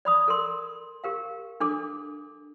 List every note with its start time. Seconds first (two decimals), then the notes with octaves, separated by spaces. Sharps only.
0.05 D5 B5 D#6
0.28 A4 A#4 C6
1.04 G4 A#4 F5
1.60 D4 A4 D6